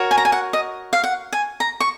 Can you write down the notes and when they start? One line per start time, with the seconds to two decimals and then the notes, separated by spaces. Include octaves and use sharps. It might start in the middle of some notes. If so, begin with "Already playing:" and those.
Already playing: F#4 A#4 C#5
0.11 G#5
0.18 A#5
0.25 G#5
0.32 F#5
0.53 D#5
0.93 F5
1.04 F#5
1.33 G#5
1.60 A#5
1.80 C#6